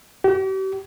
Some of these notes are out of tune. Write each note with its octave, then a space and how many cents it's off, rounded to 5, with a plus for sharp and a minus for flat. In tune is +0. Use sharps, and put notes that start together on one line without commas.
G4 -40